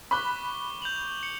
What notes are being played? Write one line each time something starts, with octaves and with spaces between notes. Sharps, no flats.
B5 C#6 D6 F#6 G7
G6 F7 F#7
C#7